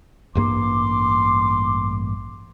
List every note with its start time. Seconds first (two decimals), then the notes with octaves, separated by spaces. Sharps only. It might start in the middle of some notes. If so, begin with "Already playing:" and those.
0.35 A1 G2 A#3 C6 D6